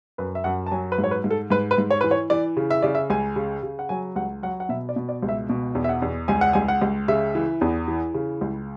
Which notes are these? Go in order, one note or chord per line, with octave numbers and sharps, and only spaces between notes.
F#2 B4
E5
F#2 F#5
A5
F#3 G#5
B4
G#2
C#5
B4
G#2
A4
G#2 B4
B4
G#2
C#5
E3 B4
C#5
E3 D5
C#3
E5
C#3 D5
E5
C#2 G#5
C#3
C#3
F#5
F#3 G#5
C#2 F#5
F#3 F#5
F#5
B2 E5
D5
B2
D5
C#2
E5
B2
E2
E5
F#5
E2
C#2 G#5
F#5
C#2 G#5
F#5
C#2
C#3 E5
E3
E2
E3
C#3
C#2